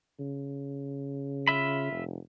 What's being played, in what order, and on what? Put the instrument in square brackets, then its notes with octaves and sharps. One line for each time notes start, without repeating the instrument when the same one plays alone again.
[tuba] C#3
[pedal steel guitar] F4 E5 B5
[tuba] F1